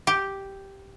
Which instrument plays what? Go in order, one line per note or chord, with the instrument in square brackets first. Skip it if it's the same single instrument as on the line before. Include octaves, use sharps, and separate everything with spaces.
[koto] G4